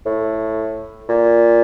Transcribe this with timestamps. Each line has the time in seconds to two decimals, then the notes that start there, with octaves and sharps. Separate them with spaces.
0.06 A2
1.08 A#2